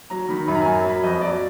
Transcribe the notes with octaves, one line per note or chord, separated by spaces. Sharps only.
F#3 A#5
D#3 B5
F#2 B5
A#5
F#2 G#5
A#5
F#3
B5
F2 D#5
F#3 D5